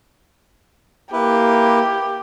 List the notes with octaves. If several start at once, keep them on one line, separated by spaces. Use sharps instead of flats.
A#3 E4 G4 B4